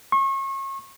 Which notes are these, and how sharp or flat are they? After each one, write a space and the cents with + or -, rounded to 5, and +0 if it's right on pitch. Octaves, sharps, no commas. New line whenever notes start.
C#6 -35